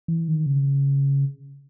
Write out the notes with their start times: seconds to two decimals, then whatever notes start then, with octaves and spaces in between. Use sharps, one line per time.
0.08 E3
0.28 D#3
0.46 C#3